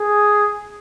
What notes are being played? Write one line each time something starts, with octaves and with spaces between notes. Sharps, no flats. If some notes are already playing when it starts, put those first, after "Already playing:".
Already playing: G#4